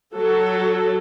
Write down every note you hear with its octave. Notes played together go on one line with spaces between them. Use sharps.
F#3 A4